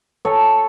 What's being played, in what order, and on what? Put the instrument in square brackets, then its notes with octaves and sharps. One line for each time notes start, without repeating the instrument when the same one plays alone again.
[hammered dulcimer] A4 C#5